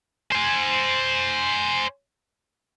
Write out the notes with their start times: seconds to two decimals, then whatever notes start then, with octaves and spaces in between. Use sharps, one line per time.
0.32 C5 G#5